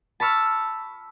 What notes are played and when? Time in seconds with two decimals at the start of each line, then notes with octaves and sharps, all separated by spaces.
0.20 A5 B5 C#6 E6 F6